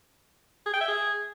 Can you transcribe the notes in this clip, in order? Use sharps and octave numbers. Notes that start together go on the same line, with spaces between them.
G#4
G5
E5
G#4